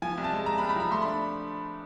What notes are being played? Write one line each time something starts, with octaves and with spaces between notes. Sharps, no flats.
F3 G#5
C2
A5
G#3
C2 A#5
B5
C2
B5
F3 A#5
A3 C6
B5
D4